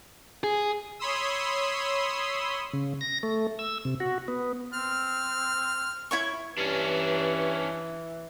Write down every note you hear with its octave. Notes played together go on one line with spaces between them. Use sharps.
G#4
C#5 B5 C6 D#6 E6
C#3
A#6
A3
E6
C3
F#4
B3
C4 F6
E4 C#5 C#6
G2 E3 C#4 D4